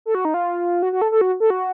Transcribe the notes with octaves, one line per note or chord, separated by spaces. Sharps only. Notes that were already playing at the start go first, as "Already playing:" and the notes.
A4
F#4
D#4
F4
F#4
F#4
A4
A4
F#4
A4
F#4